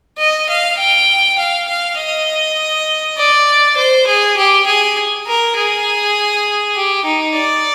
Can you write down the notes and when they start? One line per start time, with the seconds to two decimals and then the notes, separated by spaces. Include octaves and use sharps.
0.18 D#5
0.49 F5
0.78 G5
1.39 F5
1.68 F5
1.98 D#5
3.17 D5
3.77 C5
4.07 G#4
4.37 G4
4.67 G#4
5.27 A#4
5.56 G#4
6.75 G4
7.05 D#4
7.35 D5